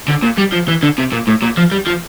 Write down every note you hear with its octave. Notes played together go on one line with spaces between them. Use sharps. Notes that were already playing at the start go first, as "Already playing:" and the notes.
D3
A#2
G3
F3
E3
D3
C3
A#2
A2
A#2
F3
G3
F3